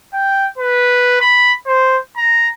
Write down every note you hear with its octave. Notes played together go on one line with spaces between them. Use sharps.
G5
B4
B5
C5
A#5